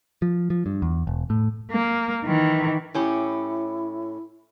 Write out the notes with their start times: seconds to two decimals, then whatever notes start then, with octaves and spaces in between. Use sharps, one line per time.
0.22 F3
0.50 F3
0.66 G2
0.82 E2
1.07 E1
1.30 A2
1.72 A#3
2.25 D#3 E3
2.94 A2 C#4 E4 G4